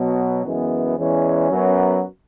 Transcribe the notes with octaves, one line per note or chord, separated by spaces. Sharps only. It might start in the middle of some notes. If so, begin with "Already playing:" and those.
Already playing: B2 F#3 B3
F#2 E3 G#3 B3
E2 E3 G#3 C#4
F#2 F#3 B3